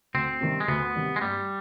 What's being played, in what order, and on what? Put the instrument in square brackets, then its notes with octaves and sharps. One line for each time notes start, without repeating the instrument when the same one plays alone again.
[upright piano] D2 [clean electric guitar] C4
[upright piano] C3 D#3 G3
[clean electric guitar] G#3
[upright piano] D2 [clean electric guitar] B3
[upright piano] C3 D#3 G3
[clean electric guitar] G#3
[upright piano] G2 [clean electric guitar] G3